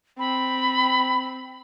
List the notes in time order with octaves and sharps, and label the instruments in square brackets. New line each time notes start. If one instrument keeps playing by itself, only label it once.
[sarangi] C4 [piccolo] B5